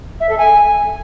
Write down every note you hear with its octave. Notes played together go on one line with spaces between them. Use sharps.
E5
A4
G#5